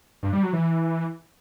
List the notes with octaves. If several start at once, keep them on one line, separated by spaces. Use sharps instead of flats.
G2
G3
F#3
E3